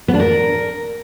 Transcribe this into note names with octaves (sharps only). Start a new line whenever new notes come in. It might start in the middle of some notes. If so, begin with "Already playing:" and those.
B3
D4
A#4